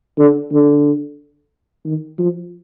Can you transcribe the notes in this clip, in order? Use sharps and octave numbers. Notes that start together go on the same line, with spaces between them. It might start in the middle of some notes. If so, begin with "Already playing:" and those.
D3
D3
D#3
F3